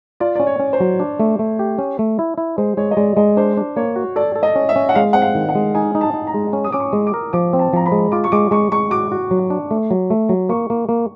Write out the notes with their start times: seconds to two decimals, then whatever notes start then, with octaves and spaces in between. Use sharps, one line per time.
0.20 F4 D5
0.36 C#4 D5
0.47 C#5
0.60 C#4
0.73 C5
0.80 F#3
1.00 D4
1.19 A3
1.39 A3
1.59 G4
1.79 C#4
1.99 A3
2.19 E4
2.38 E4
2.58 G#3 C5
2.77 G#3 C#5
2.91 D#5
2.97 G#3 D5
3.17 G#3 D#5
3.37 D4 C5
3.57 D4
3.76 A#3 C#5
3.96 F#4
4.16 A4 D5
4.36 A4
4.43 D#5
4.56 C#4
4.69 E5
4.76 C#4
4.89 F#5
4.95 G#3 F5
5.13 C4 F#5
5.22 F5
5.35 D#3
5.49 F#5
5.55 G#3
5.75 D#4 G#5
5.95 D#4
6.01 A5
6.14 D#4
6.27 A#5
6.34 G#3
6.53 C#4
6.64 D#6
6.72 C#4 D6
6.80 C#6
6.93 G#3
7.07 D6
7.14 A#4
7.33 F3 D6
7.53 C4
7.59 A5
7.73 F3 A#5
7.86 B5
7.92 G#3
8.12 F4 D6
8.24 C#6
8.32 G#3 D6
8.51 G#3 C#6
8.72 G#3 C#6
8.91 F#4 D6
9.12 F#4
9.31 F#3
9.50 D4
9.71 A3
9.91 F#3
10.10 A3
10.29 F#3
10.49 A#3 C#6
10.70 A#3
10.89 A#3